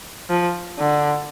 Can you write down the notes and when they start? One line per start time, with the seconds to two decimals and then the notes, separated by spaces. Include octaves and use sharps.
0.30 F3
0.79 D3